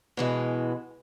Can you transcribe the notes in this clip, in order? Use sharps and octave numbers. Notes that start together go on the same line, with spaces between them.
B2 E3 G#3